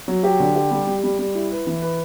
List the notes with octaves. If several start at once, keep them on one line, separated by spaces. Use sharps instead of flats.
F#3
G4
D3
G4
G3
G3
G3
G3
E4
B4
E3
B4